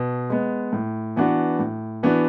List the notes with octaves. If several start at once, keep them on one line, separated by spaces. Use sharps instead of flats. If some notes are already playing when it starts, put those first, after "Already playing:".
Already playing: B2
G#3 B3
A2
E3 B3 D4 F#4
A2
E3 B3 D4 F#4